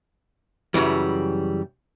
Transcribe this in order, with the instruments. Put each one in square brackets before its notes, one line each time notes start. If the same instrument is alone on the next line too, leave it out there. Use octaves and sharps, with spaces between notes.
[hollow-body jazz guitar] F#2 C#3 E3 G3